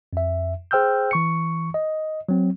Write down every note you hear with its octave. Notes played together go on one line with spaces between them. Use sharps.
F2 E5
G#4 C5 G5 E6 F6 G6
E3 C#6 C#7
D#5
F#3 C4